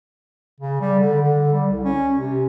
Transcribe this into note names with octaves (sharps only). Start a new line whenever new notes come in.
C#3
G3
D3
D3
G3
C2
C#4
C3